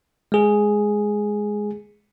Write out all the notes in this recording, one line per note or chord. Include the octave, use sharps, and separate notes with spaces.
G#3 G#4